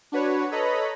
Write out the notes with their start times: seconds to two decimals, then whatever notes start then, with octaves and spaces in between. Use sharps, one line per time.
0.12 D4 F#4 B4 C#5
0.51 A4 B4 C#5 D#5 A#5 B5